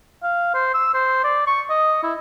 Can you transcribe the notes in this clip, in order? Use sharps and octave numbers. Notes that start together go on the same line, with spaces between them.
F5
C5
E6
C5
D5
C#6
D#5
E4